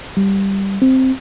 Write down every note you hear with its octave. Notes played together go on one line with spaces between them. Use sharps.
G3
C4